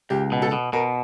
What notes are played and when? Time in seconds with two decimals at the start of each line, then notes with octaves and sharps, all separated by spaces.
0.10 C#2 G4
0.32 B2
0.42 A4
0.52 B2
0.73 B2 A#4